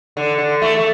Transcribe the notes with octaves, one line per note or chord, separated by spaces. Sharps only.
D3
D3
A3
A3